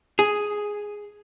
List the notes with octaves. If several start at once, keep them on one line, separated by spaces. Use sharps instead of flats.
G#4